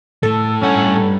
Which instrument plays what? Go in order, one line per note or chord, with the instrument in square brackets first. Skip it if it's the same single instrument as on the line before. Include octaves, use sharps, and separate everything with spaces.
[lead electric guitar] A2 A3 [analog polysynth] A4
[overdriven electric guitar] G2 F#5 [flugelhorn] C#4